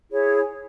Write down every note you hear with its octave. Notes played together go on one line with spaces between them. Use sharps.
E4 G#4 C#5